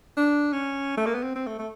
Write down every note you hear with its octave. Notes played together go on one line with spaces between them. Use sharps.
D4
C#4
A3
A#3
B3
C4
C4
A3
A3